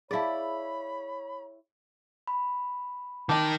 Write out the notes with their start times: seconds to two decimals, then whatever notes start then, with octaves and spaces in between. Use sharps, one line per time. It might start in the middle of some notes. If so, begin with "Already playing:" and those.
0.11 E4 G#4 C#5 D5 F5 A5 B5
2.27 B5
3.29 D#3 D#4 G5 A5 D6